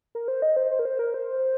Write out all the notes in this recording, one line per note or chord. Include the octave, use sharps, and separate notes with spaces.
A#4
C5
D#5
C5
C5
A#4
C5
A#4
C5